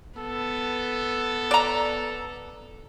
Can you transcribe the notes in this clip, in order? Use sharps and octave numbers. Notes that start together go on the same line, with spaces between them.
B3 A4
D5 A#5